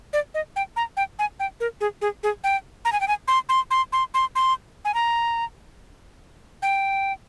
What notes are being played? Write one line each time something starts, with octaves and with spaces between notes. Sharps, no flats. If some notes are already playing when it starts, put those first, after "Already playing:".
D5
D#5
G5
A#5
G5
G#5
G5
A#4
G#4
G#4
G#4
G5
A#5
G#5
G5
G#5
C6
C6
C6
C6
C6
C6
G#5
A#5
G5